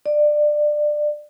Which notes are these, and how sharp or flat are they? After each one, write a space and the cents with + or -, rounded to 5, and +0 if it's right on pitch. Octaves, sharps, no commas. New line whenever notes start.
D5 +20